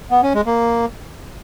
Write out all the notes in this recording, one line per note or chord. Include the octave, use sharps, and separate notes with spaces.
B3
C#4
G#3
A#3